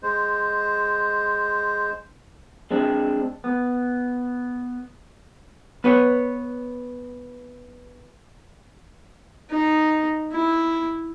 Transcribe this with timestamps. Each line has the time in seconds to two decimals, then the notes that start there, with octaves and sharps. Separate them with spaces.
0.03 G#3 C5
2.71 G#3 C4 D4
3.44 B3
5.84 B3 B4 C#5
9.50 D#4
10.32 E4